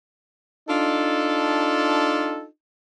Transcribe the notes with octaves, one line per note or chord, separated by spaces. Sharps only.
D4 D#4 F4 A4